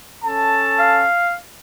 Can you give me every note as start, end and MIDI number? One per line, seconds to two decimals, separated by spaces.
0.24 1.06 61
0.24 1.06 69
0.24 1.06 81
0.79 1.35 77